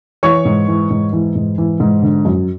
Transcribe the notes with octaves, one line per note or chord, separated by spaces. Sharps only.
E3 C#5 C#6
G#2
E3
G#2
E3
G#2
E3
G#2
D3
F#2